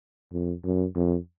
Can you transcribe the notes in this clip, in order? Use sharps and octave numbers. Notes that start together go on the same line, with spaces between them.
F2
F#2
F2